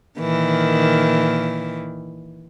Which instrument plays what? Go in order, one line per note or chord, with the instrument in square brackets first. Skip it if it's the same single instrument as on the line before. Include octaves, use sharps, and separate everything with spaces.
[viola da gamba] A#2 D#3 E3